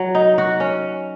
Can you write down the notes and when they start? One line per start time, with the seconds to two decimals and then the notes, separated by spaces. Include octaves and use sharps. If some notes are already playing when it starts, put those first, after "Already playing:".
Already playing: F#3
0.15 D#4
0.38 F#4
0.60 C#4